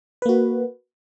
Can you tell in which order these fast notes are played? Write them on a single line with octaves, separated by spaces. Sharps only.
B4 A#3 F#4